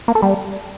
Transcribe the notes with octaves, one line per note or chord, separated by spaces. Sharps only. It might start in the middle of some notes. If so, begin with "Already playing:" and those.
A#3
A4
G3